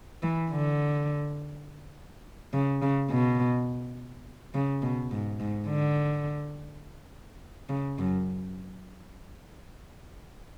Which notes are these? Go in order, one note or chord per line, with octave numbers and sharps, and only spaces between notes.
E3
D3
C#3
C#3
B2
C#3
B2
G#2
G#2
D3
C#3
F#2